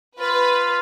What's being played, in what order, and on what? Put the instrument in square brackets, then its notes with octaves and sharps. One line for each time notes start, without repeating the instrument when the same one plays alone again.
[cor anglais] F4 [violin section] B4